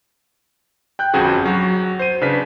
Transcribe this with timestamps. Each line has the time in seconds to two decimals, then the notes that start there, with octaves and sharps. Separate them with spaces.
0.99 G5 F#6 G6
1.14 G1 F2 C#4 F#4 G#4
1.45 F#3 F#4
1.99 C5 D#7
2.21 C#3 D4 B4 B6